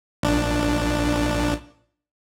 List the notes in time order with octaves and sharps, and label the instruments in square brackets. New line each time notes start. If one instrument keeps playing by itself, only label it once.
[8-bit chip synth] A#1 D4